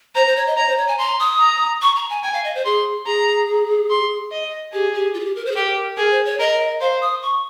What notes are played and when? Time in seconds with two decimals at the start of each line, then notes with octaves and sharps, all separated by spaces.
0.15 C5 A#5
0.26 C5
0.37 C#5
0.47 D#5
0.57 C#5 A#5
0.67 C5
0.78 C#5
0.88 G#5
0.98 A#5 C6
1.20 D#6
1.40 A#5
1.82 C#6
1.96 A#5
2.10 G#5
2.23 G5 G#5
2.34 F5
2.44 D#5
2.55 C5
2.65 G#4 C6
3.06 G#4 A#5
3.90 C6
4.31 D#5
4.73 G4 G#4
4.94 G4
5.14 F4
5.20 G#4
5.25 G4
5.36 A#4
5.46 C5
5.52 G#4
5.56 G4 A#4
5.97 G#4 A#4
6.11 C5
6.25 C#5
6.39 A#4 D#5
6.81 C5 F5
7.01 D#6
7.22 C#6